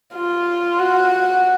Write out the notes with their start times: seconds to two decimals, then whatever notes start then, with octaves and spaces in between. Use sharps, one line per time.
0.15 F4
0.79 F#4